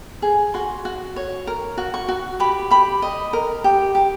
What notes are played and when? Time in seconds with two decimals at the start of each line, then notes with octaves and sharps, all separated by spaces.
0.22 G#4
0.54 F#4 C6
0.85 F#4
1.16 C#5
1.47 A#4
1.78 F#4
1.94 C#6
2.09 F#4
2.40 G4 B5
2.71 G4 B5
3.02 D#5
3.33 A#4
3.64 G4
3.95 G4